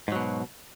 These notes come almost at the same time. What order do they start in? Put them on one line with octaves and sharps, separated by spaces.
G#2 F#3 B2